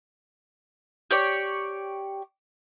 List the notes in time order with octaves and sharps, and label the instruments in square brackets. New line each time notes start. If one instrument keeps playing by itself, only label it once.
[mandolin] G4 C#5 D5